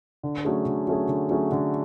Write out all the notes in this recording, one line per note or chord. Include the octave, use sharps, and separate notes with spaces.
D3
F#3 A3 C#4 G#4
D3
F#3 A3 C#4 G#4
D3
F#3 A3 C#4 G#4
D3